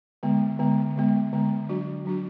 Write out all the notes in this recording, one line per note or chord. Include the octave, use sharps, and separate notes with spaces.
D3 G#3 B3
D3 G#3 B3
D3 G#3 B3
D3 G#3 B3
F#3 D4 F#4
F#3 D4 F#4